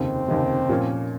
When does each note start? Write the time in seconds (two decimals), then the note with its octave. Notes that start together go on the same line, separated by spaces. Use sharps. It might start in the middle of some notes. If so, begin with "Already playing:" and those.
Already playing: F1 D#2 C#3 C4
0.29 F1 D#2 C#3
0.69 A#2 F3 A#3 C#4